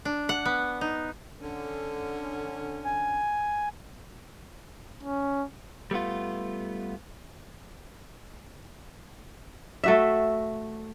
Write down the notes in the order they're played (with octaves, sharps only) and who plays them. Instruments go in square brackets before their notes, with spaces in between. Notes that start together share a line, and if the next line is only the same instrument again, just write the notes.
[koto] D4
F#5
B3
D#4
[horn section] D3 C#4
[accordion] G#5
[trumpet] C#4
[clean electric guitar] G3 A3 B3 F4
[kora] A3 F#4 E5